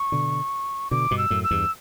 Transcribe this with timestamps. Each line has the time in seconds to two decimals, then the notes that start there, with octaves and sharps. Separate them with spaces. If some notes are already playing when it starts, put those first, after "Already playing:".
Already playing: C#6
0.12 B2 D3
0.91 B2 D3 D6
1.11 G2 B2
1.18 E6
1.30 F#2 A2
1.44 E6
1.51 E2 G2